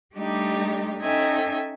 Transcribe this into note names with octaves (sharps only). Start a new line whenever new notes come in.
G3 A3 D4 D#4 G4
C#4 D#4 A4 E5 G5 G#5